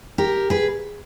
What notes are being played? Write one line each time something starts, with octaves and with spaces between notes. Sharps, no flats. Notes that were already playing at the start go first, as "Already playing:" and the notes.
G4 A#4
G#4 B4